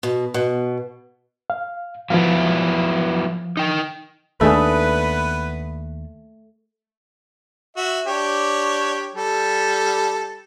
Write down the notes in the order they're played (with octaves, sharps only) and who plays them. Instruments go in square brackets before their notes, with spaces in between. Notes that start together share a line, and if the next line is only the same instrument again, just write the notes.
[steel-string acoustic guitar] B2
B2
[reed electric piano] F5
[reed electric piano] F3 F5 [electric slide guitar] F#3 B3 E4
[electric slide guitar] D#4 G5
[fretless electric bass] D#2 D4 [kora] A3 [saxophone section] B3 B4 [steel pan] G#4 E5
[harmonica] F#4 E5
D4 G4 C#5
G3 A4